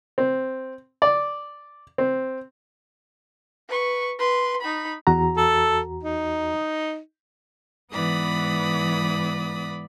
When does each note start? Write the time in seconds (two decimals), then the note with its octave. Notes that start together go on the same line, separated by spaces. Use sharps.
0.18 C4
1.02 D5
1.98 C4
3.69 B4 C#6
4.19 B4 C6
4.61 D#4 B5
5.07 E2 F#4 A#5
5.37 A4
6.03 D#4
7.92 G#2 E3 B3 D5 B5 D#6